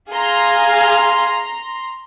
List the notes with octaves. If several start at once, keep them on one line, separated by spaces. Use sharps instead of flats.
G#4 F5 A#5 C6